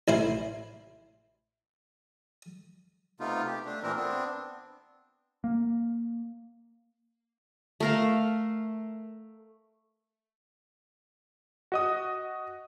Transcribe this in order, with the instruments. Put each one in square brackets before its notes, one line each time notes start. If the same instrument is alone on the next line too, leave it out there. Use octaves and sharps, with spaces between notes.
[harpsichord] A1 E4 C5
[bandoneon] C3 A3 B3 D#4 F4
G4
A3 D4
A#2 E3 A3 C4 D4 A#4
B3 C4 D4
[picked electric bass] A#3
[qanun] A3 A#4 F5
[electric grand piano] F#4 D#5 D#6